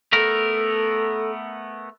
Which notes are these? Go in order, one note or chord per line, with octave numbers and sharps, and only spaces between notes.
A3 B3 A4 A#4